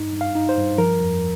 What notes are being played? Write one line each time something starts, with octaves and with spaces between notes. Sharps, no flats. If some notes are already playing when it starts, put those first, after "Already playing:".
Already playing: G2 D#4
G2
F5
D#4
C5
G2
F3 A#4
F2